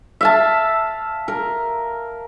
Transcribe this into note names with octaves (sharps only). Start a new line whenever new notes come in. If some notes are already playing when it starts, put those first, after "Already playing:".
E5 F5 A5
A#4